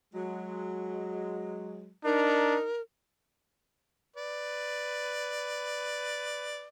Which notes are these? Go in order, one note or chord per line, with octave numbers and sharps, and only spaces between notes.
F#3 G#3
D4 D#4 A#4
B4 D5